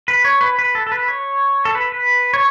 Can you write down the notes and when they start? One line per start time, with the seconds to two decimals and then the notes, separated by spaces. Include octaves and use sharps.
0.08 B4
0.25 C#5
0.41 B4
0.59 B4
0.75 A4
0.87 A4
0.92 B4
1.08 C#5
1.65 A4
1.75 B4
1.92 B4
2.34 C#5